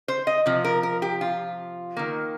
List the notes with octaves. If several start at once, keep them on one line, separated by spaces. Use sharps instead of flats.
C5
D#5
C3 F3
A#4
A#4
G4
F4
D#3 A#3